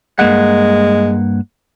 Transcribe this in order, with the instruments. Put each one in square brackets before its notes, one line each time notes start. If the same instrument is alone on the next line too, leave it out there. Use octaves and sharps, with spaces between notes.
[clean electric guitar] G2 A#3 F#5 [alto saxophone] G#3